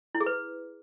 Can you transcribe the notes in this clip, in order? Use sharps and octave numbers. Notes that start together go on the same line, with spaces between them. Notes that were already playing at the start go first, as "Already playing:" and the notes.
E4
G#4
B4